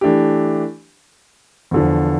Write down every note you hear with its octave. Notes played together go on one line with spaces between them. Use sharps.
E3 A3 D4 G4
E2 D3 F3